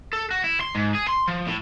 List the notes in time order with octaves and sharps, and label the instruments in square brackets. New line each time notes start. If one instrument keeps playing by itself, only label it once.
[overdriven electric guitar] A4
F#4
E4
C6
G#2
G#4
C6
F3
A2